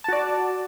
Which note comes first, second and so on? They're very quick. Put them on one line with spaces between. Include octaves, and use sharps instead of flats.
A5 F#4 D5